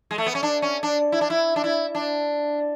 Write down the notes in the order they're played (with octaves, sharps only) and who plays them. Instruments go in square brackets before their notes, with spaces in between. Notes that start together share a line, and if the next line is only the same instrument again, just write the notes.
[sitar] G#3
A3
B3
C#4
D4
C#4
D4
E4
D4
E4
D4
E4
D4